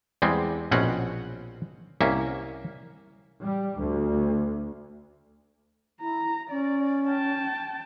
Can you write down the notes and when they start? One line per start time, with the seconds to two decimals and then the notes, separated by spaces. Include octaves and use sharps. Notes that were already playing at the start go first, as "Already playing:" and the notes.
0.22 E2 G3 G#3 C4
0.71 A#1 B2 C4 C#4 F#5
2.01 C2 A#3 C#4 E5
3.42 G3
3.81 D2
6.01 E4 A#5
6.51 C#4 D5
7.08 G5 A5